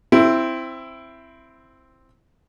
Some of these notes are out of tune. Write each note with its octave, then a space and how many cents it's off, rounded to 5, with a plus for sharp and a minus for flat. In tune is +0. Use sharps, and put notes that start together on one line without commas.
C4 +0 E4 +10